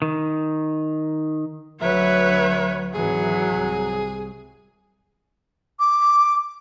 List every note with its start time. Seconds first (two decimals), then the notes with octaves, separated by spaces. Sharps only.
0.02 D#3
1.82 D2 F#3 B4 C#5 E5
2.94 G#1 E3 F#3 G#4
3.51 C2
5.80 D6